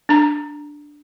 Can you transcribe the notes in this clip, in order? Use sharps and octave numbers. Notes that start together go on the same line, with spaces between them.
D4 A#5